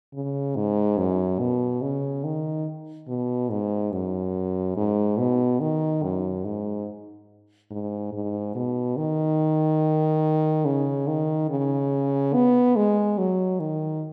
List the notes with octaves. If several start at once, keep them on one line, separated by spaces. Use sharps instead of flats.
C#3
G#2
F#2
B2
C#3
D#3
B2
G#2
F#2
G#2
B2
D#3
F#2
G#2
G#2
G#2
B2
D#3
C#3
D#3
C#3
B3
G#3
F#3
D#3